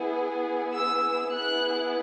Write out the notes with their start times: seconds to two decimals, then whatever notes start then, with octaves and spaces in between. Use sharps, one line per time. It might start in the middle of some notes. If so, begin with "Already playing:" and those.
Already playing: B3 E4 G#4
0.73 E6
1.33 B3 E4 G#4 F#6